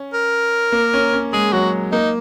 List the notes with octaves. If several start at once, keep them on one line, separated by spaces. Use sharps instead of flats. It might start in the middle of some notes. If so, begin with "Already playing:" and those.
Already playing: C#4
A#4
A#3
C#4
C#4
G#3 G#4
F#3 F#4
A#3 D#4